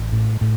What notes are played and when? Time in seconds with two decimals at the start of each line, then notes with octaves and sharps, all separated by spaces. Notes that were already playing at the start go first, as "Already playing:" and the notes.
Already playing: A1
0.12 A2
0.41 A2